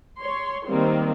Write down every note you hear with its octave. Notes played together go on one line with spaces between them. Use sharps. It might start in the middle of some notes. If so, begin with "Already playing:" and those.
C#5 C6
D#3 G3 A#3 C4